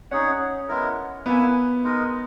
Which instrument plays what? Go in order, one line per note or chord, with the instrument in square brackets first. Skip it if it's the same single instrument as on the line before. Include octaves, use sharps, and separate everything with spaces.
[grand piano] C#4 [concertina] D#4 G#4 C#5 F#5
[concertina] G#3 B3 E4 A#4
[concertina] A#3 E4 B4 E5 G#5 [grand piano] B3
[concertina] G#3 D#4 A#4 D#5